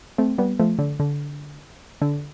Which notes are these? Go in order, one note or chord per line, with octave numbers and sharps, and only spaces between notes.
A3 C4
G3 B3
F3 A3
D3
D3
D3